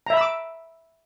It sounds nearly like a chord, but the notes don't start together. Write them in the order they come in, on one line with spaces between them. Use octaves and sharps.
A#5 E5 B5 E6 D6